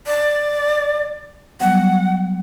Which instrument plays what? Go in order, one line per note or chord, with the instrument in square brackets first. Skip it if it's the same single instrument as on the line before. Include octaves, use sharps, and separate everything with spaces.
[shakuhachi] D5
[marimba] F#3 G3 B3 [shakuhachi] F#5